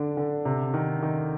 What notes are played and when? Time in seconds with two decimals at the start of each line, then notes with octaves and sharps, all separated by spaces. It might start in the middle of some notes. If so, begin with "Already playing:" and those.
Already playing: D3 D4
0.17 D3
0.45 C3
0.74 D#3
1.03 D#3